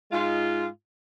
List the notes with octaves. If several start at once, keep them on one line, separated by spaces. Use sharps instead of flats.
G#2 G#3 D#4 F4